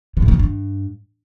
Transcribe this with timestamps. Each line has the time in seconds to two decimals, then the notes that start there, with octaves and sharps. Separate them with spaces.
0.17 D3
0.22 A2
0.28 D3
0.34 B2
0.39 G2